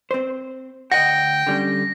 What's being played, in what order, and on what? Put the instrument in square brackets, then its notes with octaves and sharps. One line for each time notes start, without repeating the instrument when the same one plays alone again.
[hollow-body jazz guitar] C4 C5
[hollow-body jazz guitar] D2 D#5 F#5 [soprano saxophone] G5 [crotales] A#6
[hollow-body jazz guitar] D3 G3 C#4